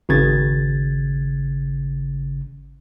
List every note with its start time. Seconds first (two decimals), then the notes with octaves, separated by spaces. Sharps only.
0.09 G#1 C#3 G#6 A6